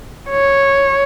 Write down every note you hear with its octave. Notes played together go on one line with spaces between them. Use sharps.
C#5